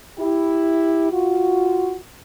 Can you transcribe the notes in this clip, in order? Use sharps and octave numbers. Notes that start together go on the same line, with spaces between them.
E4 G4
F4 F#4